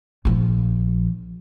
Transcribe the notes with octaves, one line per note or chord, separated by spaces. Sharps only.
A#1 F3